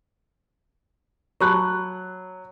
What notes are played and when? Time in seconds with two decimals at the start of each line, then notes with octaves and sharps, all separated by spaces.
1.40 F#3 A5 B5 C#6 F#6